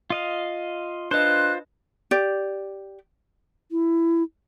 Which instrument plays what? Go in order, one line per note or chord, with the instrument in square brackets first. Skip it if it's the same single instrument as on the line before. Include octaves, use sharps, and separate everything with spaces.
[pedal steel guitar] F4 D#5 F5
[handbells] D4 B4 D#5 [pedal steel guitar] F4 C5 [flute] F#6
[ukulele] G4 D5
[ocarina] E4